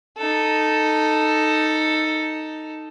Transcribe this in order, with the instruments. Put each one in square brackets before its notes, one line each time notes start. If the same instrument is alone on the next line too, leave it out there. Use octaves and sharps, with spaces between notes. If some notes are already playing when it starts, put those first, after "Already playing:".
[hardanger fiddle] D#4 A4